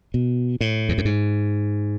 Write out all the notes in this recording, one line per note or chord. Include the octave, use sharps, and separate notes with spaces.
B2
A2
E2
F#2
G#2